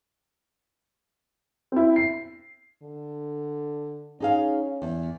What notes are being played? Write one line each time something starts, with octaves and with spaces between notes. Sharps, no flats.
C4 E4
C7
D3
C#4 D#4 G#4 F5
E2